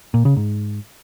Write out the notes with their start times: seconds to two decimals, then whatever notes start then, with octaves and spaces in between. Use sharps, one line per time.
0.14 A#2
0.25 C#3
0.37 G#2